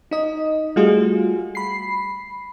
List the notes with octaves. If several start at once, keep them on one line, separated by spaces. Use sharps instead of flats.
D#4 D#5
G3 A3 F4 F#4 G#4
B5 C7